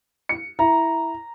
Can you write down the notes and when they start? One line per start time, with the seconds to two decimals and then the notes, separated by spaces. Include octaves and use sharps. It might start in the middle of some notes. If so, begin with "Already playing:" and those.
0.29 C#7
0.59 E4 A#5